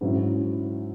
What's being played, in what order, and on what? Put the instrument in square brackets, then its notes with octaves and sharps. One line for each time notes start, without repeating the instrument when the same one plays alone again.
[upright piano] G#2 F#3 C#4 E4